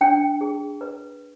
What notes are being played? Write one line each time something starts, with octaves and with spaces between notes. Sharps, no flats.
D4 G5
G#4
B4